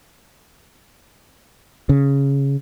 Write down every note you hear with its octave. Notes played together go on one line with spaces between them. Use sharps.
C#3